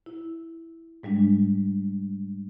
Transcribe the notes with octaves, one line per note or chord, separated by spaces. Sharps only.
E4
G#2 G3 G#3 D4